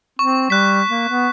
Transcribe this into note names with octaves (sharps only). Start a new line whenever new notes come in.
C4 C#6
G3 F#6 B6
A#3
B3